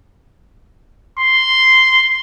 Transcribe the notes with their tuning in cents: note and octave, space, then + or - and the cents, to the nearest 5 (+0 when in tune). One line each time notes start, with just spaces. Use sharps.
C6 -5